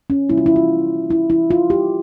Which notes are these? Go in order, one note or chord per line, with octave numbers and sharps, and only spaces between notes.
C#4
C3 G3 A#3 E4
F4
E4
F4
E4
E4
F4
G4